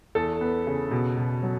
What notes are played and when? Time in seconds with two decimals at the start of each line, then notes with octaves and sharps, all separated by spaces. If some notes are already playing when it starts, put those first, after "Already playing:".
0.15 E2 A4
0.41 B3
0.67 C#3
0.91 B2
1.17 B2
1.43 F#3